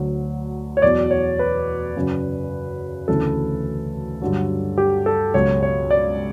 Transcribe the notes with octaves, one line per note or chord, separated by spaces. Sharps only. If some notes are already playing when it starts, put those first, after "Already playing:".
Already playing: D2 D3 F#3
C#5
E2 B2 F#3 D5
C#5
B4
F#2 C#3 F#3
D2 C#3 E3 A4
G2 D3 F#3
G4
A4
C#2 B2 F#3 C#5
C#5
D5